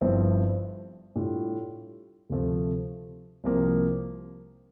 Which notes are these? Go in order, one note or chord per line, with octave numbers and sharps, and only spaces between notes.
G1 G2 F3 C4 E4
A2 G3 D4 F4
D2 C3 F3 A3
C2 C3 F3 A#3